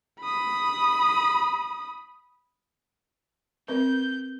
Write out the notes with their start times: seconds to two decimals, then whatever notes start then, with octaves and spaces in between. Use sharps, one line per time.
0.20 B5 D#6
3.68 C4 A#4 B4 G6